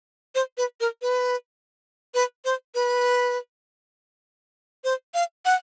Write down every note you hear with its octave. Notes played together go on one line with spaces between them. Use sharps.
C5
B4
A#4
B4
B4
C5
B4
C5
F5
F#5